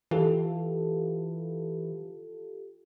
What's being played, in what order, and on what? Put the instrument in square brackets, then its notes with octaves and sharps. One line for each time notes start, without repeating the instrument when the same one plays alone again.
[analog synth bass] E3 [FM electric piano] F4 G4 A4